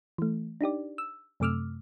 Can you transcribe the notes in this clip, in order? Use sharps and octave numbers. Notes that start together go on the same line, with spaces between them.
E3 A3
D4 D#4 G4 D5
E6
F#2 C3 A3 D6 E6 F6